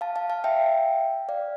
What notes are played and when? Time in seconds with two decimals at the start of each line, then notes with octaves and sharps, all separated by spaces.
0.01 F5 A5
0.16 F5 A5
0.30 F5 A5
0.44 E5 G5
1.29 D5 F5